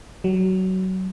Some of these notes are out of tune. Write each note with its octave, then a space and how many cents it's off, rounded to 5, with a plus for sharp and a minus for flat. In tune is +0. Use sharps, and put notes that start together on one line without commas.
F#3 +20